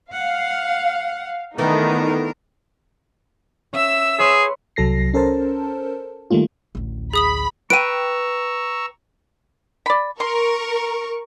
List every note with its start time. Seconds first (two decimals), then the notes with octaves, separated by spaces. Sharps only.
0.13 F5 F#5
1.58 D#3 E3 A3 B3 D4 D#4 A#4
3.73 C#4 E5 E6
4.19 G#4 B4 C#5 C6
4.76 C2 F#3 A4 A#6 C7
5.14 C#4 A4 A#4 C5 A5
6.31 D#3 G3 A3 A#3 F4
6.75 A1 D2
7.13 G#4 B5 D#6 F#7
7.70 B4 G5 A#5 C#6 E6 D7 D#7
9.86 D5 B5
10.20 A#4 C6 C#6